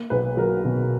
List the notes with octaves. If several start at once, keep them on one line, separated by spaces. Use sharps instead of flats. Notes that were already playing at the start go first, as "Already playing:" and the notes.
Already playing: A#3
B1 B4
F#3 A#4
B2